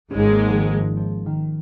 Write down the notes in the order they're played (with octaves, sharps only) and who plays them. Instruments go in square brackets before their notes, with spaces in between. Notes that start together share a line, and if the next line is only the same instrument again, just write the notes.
[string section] G#1 G#2 G#3 [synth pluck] C#4
[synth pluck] A#3
F3
D#3
F3
F3
D#3